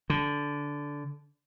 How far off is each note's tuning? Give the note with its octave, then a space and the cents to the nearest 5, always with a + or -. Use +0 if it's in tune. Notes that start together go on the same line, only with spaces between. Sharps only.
D3 -15